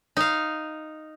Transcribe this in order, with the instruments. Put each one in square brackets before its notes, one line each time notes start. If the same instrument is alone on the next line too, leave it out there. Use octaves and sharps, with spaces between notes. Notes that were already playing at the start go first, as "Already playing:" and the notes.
[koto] D#4 F5